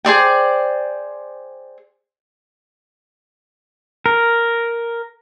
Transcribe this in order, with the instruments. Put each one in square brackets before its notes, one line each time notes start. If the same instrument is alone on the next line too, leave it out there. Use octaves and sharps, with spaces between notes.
[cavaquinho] G#4 C5 D5 G5
[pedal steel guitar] A#4